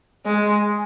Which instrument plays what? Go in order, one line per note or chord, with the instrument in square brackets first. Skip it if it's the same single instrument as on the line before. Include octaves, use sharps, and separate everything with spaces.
[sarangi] G#3